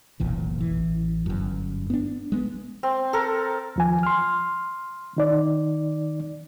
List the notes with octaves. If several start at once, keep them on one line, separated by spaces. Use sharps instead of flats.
F1 B1 A#2 E3
A1 E3
G1 F#2
B3 C4 D4
G#3 A#3 B3
C4
A4 A#4
D#2 F3 G#5
C6 F6
D#3 D#4 D5